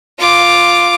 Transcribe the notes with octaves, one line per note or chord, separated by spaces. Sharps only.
F4 D6